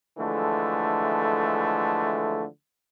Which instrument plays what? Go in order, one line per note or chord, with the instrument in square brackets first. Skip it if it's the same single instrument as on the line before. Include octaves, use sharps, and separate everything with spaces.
[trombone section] D3 E3 F3 G#3 A3